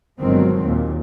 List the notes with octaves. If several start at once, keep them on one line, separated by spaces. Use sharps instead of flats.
G1 B2 D#3 F#3 G#3 C4
D#2 A#2